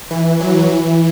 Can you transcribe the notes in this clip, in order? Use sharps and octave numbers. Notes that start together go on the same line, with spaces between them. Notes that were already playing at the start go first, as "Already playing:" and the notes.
E3
F#3
E3